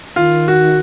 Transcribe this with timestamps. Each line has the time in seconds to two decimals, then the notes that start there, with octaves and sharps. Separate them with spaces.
0.16 D#3 F4
0.48 F#4